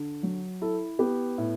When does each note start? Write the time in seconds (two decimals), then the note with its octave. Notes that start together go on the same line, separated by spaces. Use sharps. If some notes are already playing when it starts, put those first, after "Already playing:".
Already playing: D3
0.23 F#3
0.61 E4 A4
0.99 B3 G4
1.38 A2